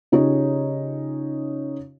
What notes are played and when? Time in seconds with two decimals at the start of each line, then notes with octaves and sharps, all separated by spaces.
0.12 C#3 C#4 D#4 F4 G4 C#5